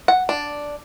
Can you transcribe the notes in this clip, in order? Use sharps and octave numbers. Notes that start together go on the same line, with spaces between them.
F#5
D4